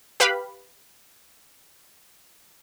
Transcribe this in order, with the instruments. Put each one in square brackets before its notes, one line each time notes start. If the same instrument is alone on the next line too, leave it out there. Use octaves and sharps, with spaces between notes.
[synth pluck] G4 B4 F5 B5